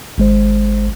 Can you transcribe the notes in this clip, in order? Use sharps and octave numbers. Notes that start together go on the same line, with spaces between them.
G#1 G#3 C5